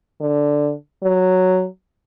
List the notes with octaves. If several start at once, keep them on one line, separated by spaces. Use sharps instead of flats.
D3
F#3